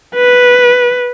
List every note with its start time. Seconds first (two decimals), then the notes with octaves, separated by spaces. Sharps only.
0.15 B4